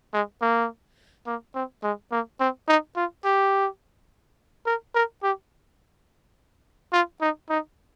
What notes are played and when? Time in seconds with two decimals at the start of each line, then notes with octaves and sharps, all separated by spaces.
0.13 G#3
0.41 A#3
1.26 A#3
1.55 C4
1.83 G#3
2.11 A#3
2.40 C4
2.68 D#4
2.96 F4
3.25 G4
4.66 A#4
4.95 A#4
5.23 G4
6.93 F4
7.21 D#4
7.50 D#4